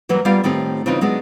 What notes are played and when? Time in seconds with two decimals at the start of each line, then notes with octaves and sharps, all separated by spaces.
0.09 E3 F#3 G3 A#3
0.25 G3 A#3 B3 F4 G4 F5
0.44 A2 D#3 A3 C4 G4
0.86 C#3 E3 C4 D#4 F4
1.01 F#3 G#3 B3 D4